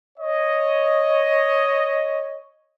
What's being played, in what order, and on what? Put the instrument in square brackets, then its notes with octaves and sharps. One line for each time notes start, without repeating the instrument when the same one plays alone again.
[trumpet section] C#5 D#5